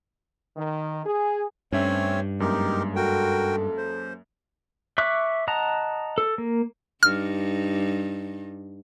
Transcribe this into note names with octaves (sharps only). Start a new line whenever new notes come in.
D#3
G#4
G2 A3 C4 C#4 G4 C#5 E5
F#2 G#3 A#3 D#4 G4 A#4
F#4 A4 A#4 G5
C5
E5 C#6 D6 F#6
D#5 F#5 A5 A#5
A4
A#3
G2 D#4 F6